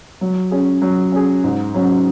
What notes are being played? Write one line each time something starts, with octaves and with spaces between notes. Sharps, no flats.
F#3
C#4 G#4
F#3
C#4 G#4
G#2
F#3 C#4